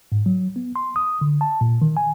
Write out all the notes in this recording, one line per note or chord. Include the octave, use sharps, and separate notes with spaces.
G#2
F#3
B3
C6
D#6
D3
A5
A#2
D#3
G#5